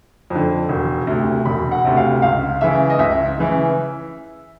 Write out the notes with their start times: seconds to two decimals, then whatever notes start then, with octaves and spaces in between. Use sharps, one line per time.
0.30 F2
0.35 D3
0.69 E1
1.07 D2 C3
1.45 E1 B5
1.71 F#5
1.85 D2 C3
1.97 F5
2.22 C#2 F5
2.61 C#3 E3 E5
2.90 D#5
2.99 C#2 E5
3.38 C#3 E3